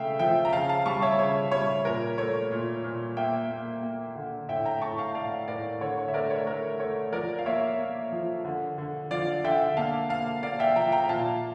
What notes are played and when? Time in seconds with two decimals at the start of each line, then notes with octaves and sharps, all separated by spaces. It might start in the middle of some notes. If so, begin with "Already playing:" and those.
Already playing: C#3 A3 E5 F5 G5
0.19 F3 E5 G5
0.45 A#5
0.53 C#3 F5 A5
0.69 F5 A5
0.86 G3 A5 C#6
1.02 C#5 E5
1.19 C#3 C#5
1.51 G3 C#5
1.85 A#2 A#4
2.18 A3 C#5
2.51 A#2
2.84 A#2
3.17 A#3 E5 G5
3.50 A#3
3.83 A#3
4.15 D3
4.49 A2 E5 G5
4.65 G5 A#5
4.82 A2 A5 C#6
4.98 F5 A5
5.14 A2 D5 F5
5.48 A2 A#4 D5
5.81 D3 C#5
5.98 C#5
6.08 E5
6.14 A3 A#4 D5
6.30 C#5
6.47 A3 A#4
6.80 A3 C#5
7.13 F3 A#4 D5
7.39 F5
7.46 A#3 C#5 E5
7.79 A#3
8.12 F3
8.45 D3
8.78 D3
9.11 F3 D5 F5
9.44 D3 E5 G5
9.77 A#3 F5 A5
10.09 A#3 F5 A5
10.43 A#3 D5 F5
10.60 E5 G5
10.76 F3 G5 A#5
10.92 G5 A#5
11.09 A#2 F5 A5